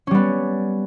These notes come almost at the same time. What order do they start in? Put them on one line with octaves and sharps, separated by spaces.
C#4 G3 B3